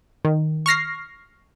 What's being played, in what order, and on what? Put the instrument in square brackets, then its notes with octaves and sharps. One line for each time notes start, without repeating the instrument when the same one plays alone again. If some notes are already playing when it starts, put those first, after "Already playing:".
[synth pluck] D#3
C#6 F6 A#6 C7